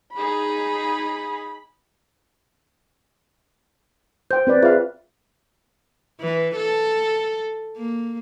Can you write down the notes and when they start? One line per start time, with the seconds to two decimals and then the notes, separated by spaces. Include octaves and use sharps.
0.14 D#4 G#4 B5
4.31 C5 G5 G6
4.47 C4 B4 D5
4.63 F4 G#4 B4 E5 F5
6.21 E3
6.56 A4
7.77 A#3